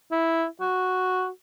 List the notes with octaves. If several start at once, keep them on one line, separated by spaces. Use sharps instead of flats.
E4
F#4